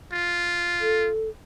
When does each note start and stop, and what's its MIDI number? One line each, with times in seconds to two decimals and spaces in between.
0.12 1.09 65
0.81 1.29 69